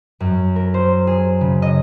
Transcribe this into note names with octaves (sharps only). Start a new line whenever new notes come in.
F#2
A#4
C5
G#4
C#3
D#5